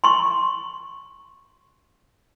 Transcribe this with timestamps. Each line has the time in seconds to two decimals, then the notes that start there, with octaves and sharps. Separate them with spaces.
0.04 C6 C#6